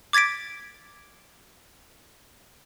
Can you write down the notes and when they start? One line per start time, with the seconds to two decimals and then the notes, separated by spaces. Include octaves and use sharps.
0.13 D6 G#6 A6 B6 D7